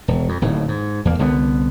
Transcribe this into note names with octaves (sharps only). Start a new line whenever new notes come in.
E1
F2
D1 D#2 A2
G#2
E2 A#3
C2 D3 A#3 B3